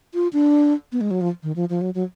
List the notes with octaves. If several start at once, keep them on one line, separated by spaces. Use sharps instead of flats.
F4
D4
B3
G#3
F#3
F3
D#3
F3
F3
F#3
F#3